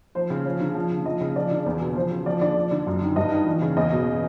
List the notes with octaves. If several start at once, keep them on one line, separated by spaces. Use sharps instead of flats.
F3 C5
C#3
F3 C#5
D3
F3
C#3
F3 D#5
C#3
F3 D5
D3
E2
B2
F3 C5
C#3
F3 D5
D3 D5
F3
D3
F#2
D#3
G2 D#5
D#3
E3
C#3
E2 D#5
B2